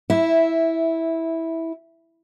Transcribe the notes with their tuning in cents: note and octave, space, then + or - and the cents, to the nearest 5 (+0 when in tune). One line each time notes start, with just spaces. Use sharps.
E4 -10 E5 +0